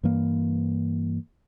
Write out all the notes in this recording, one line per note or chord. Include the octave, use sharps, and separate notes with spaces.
G2 E3 A#3